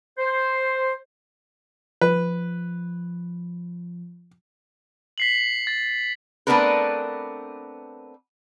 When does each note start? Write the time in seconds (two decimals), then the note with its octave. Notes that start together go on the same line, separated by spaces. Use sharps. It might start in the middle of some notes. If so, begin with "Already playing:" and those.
0.18 C5
2.01 F3 B4
5.18 B6 C7 F#7
5.67 A6
6.47 A3 B3 C4 D4 A#4 B4